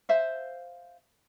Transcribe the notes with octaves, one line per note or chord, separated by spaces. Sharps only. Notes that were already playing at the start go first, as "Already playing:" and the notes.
C5 E5 F5